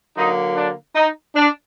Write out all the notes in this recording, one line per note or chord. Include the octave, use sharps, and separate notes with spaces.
D3 F#3 A#3 D#4
D4
D#4
D4